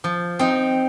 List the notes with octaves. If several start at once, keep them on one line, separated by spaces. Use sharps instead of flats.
F3
C4 D#4